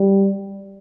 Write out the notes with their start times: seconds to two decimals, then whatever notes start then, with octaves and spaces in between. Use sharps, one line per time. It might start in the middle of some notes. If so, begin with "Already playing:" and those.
Already playing: G3